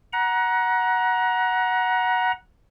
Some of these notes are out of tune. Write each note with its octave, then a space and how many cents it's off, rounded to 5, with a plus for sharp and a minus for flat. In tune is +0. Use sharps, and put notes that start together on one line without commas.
F#5 +0 A#5 +30